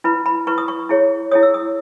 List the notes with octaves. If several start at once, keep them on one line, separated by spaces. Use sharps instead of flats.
E4 B4 B5
B5
E4 B4 C#6
D#6
C#6
E4 G#4 C#5
E4 G#4 C#5 D#6
E6
D#6